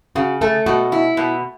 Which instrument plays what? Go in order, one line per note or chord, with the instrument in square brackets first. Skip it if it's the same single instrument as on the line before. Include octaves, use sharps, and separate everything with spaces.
[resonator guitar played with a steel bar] C#3 [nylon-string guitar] F#4
[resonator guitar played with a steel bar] A3 [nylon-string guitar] A4
[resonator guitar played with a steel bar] B2 [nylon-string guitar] F#4
[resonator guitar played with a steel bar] E4
B2